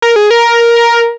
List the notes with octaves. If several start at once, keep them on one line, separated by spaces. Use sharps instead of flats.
A#4
G#4
A#4